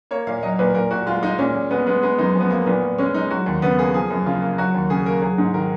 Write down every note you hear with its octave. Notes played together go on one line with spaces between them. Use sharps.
A#3 C#5
A#2 F5
F#3 D#5
A#2 B4
A#2 A#4
A#2 F#4
G#3 F4
G#3 D#4
A#2 C#4
A#2
G#3 B3
G#3 B3
G#3 B3
F#2 D#4
F3
B3
F#2 A#3
A#2 B3
A#2
G#3 C#4
G#3 D#4
F#3 F#4
D#2
C#3 B3
A#3 G#4
F3 G#4
F#2
C#3 F4
A#3
F#3 F#4
D#2
C#3 G#4
A#3 A#4
F#3 G#4
G#2
D#3 A#4